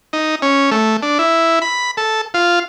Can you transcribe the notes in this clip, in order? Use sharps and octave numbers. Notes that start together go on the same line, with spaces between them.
D#4
C#4
A3
D4
E4
B5
A4
F4